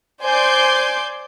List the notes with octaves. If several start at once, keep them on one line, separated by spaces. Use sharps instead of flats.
C5 D5 G#5 C6 D6 G6